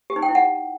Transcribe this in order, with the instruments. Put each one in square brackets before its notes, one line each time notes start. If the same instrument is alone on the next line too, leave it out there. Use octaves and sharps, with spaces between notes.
[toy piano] G4
D#4
G5
E4
F#5